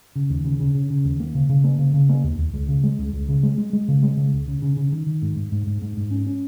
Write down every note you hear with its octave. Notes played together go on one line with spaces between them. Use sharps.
C#3
D#2
C#3
C#3
C#3
C#3
D#2
A#3
C#3
C#3
A#3
C#3
C#3
A#3
D#2
D#2
C#2
C#3
G#3
C#2
C#2
C#3
G#3
G#3
G#3
C#3
G#3
C#3
C#2
C#3
C#3
C#3
D#3
D#3
G#2
G#2
G#2
G#2
G#2
G#2
C#4
C#4